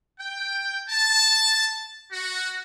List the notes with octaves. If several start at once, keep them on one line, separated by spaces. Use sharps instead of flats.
G5
A5
F#4